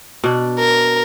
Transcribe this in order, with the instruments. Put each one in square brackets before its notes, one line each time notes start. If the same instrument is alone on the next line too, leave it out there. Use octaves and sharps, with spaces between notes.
[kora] B2 D4
[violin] A#4